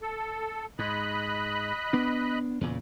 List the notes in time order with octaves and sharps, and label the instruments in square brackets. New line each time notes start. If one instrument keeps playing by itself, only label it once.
[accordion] A4
[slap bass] G#2 [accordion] D#5 B5 F#6
[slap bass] B3 D4
E2 A#2 C#3